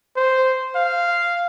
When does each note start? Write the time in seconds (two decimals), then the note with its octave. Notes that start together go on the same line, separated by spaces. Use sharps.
0.16 C5
0.76 F5